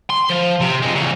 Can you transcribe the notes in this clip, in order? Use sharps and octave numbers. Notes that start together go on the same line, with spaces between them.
C6
F3
C3
F2 G#3
E2 C#3